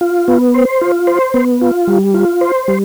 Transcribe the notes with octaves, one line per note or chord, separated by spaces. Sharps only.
F4
B3
C5
F4
C5
B3
F4
G3
F4
C5
G3